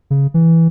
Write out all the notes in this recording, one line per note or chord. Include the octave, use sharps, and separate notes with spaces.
C#3
E3